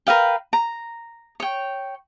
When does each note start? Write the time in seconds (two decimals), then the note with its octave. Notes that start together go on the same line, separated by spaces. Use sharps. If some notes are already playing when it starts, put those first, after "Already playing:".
0.07 A#4 B4 F5 G5
0.53 A#5
1.40 C#5 G5